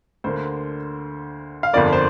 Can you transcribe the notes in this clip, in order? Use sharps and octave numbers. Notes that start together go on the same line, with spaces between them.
D2 D3 A#3 C5
F5
G1 F2 D3 F3 A#3 D5
C5